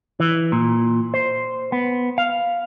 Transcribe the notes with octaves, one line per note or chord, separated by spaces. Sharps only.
E3
A#2
C5
B3
F5